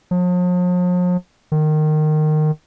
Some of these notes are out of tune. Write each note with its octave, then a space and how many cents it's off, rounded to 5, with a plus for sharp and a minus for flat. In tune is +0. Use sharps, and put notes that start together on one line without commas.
F3 +45
D#3 -20